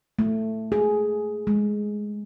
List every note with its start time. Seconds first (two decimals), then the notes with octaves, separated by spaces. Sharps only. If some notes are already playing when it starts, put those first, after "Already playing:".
0.19 A3
0.72 G#4
1.47 G#3